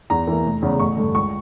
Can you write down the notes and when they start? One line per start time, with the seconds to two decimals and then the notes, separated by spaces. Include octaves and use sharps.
0.10 E2 A#5
0.27 E3 A#3
0.44 F1
0.62 E2 C#3
0.80 A1 C#6
0.97 G2 D3
1.15 C#2 C#6